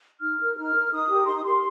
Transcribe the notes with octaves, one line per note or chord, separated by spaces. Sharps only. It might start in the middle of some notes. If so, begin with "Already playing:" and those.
D#4 F6
A#4
D#4 F6
A#4
D#4 D#6
G4 A#4
D#4 C6
D#6
G4 A#4 C6